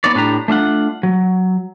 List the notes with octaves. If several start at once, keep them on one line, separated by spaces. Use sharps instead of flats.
B3 D#4 C#5 D5
A2 D4 G4 A#5
A3 D4 F4 F#5
F#3